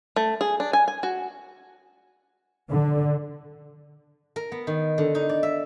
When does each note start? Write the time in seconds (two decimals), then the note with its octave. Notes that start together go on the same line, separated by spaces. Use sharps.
0.16 A3
0.41 G#4
0.60 D4
0.73 G#5
0.88 G#5
1.03 F#4
2.69 D3
4.36 A#4
4.52 B3
4.67 D#3
4.98 D3
5.15 D#4
5.29 D5
5.43 E5